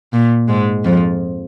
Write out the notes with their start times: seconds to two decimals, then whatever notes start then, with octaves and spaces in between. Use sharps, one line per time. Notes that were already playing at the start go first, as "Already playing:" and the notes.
0.13 A#2
0.48 G#2 G#3
0.84 F2 F3